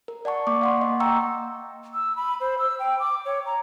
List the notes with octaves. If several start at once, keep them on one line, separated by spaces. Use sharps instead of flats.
A#4
D5 F#5 A5 C#6
A#3 C#6 D6
F5 F#5 C6
A#3 D#5
G5 A#5 C#6 E6
E6
B5
C5
E6
G5
D6
C#5
A#5